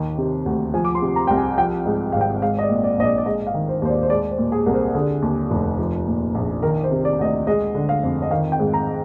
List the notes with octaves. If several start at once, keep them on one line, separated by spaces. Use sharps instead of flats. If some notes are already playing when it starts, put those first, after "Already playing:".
Already playing: D#2 D#3
C3
D2
F3 G#5
D6
C6
C3
A#5
C2 G5
G#5
F3 G5
G#2
G#1 F5
G5
G#3 F5
D#5
D5
A#2
D5
A#1 D#5
D5
D5
G#3 D#5
F5
D#3
C5
D#2 C5
D5
C5
G#3 D5
C5
A#2
G#4
C2 A#4
C5
D3 G#4
D#2
F1
F3
A#2
A#1
D#3 A#4
C5
C3
D5
D2 D#5
D5
G#3 D#5
D3
F5
F2
D#5
D#3 F5
G5
G#2
A#5